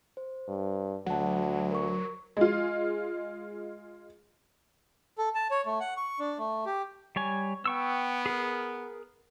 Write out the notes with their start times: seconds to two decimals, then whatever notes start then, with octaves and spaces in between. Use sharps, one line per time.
0.17 C5
0.48 G2
1.06 D2 F#3 F#5 A5
1.71 A#4 C#6
2.37 G#3 F4
5.18 A4
5.35 A5
5.51 C#5
5.66 A3
5.80 F#5
5.97 C#6
6.19 D4
6.38 A3
6.66 G4
7.16 G3 C#5 G#5
7.66 B3 G5 C#6 E6
8.26 G#4 A#4